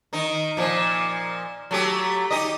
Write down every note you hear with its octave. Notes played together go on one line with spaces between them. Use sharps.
D#3 D#4
A#2 F3
F#3 A3 G4
D#4 G4 D#5